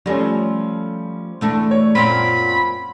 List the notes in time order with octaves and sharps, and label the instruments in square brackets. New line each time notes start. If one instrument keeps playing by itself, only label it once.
[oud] F3 A3 [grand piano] G3 C#4
[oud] E2 A3 D4
[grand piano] C#5
[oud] F#2 A#2 C4 [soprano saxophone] B5